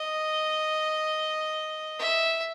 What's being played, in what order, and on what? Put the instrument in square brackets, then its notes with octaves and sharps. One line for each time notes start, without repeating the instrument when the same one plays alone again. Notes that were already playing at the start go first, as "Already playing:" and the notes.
Already playing: [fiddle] D#5
E5